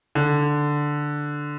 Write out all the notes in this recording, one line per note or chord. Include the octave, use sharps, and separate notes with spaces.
D3